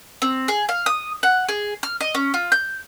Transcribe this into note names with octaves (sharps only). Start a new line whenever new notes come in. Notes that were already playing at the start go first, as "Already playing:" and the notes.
C4
G#4
F5
D#6
F#5
G#4
F6
D#5
C#4
F4
G6